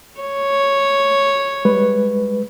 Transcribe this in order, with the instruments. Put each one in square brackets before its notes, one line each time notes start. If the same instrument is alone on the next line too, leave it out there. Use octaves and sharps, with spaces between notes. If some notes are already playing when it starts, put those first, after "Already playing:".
[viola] C#5
[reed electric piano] G3 G#3 B4